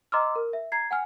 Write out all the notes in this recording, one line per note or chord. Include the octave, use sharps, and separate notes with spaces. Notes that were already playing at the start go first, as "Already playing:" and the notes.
D#5 A#5 C6 D6 E6 F6
A#4
E5
A#5 G#6 C7
F#5 G#5 F6